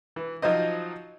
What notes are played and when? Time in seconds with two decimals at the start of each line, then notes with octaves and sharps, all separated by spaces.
0.16 E3
0.42 F3 F#3 D#4 C5 D#5